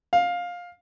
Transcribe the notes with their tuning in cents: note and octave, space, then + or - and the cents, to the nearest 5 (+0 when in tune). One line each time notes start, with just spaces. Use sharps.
F5 +15